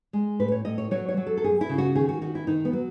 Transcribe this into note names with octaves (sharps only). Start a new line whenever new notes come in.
G#3
A2 B4
C#5
A2 D#5
C#5
F#3 C#5
C#5
F#3
A4
A4
F#2 G#4
E4
C#3
F#4
D#3 G#4
F#4
D#3 F#4
E4
D#3 D#4
B3
F#3